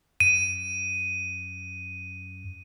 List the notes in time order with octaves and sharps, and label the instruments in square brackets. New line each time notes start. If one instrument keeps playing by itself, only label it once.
[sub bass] F#2 [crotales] D#7